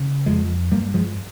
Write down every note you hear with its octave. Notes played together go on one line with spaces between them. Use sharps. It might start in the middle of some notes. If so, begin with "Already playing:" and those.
Already playing: C#3
F2 F3 G#3
G2 G3 A#3
F3 G#3